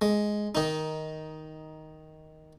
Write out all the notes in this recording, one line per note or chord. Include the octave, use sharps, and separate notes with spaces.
G#3
D#3 D#4